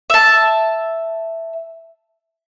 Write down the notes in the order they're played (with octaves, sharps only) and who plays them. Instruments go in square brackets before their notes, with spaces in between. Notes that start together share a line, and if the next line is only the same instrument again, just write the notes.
[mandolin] E5 A5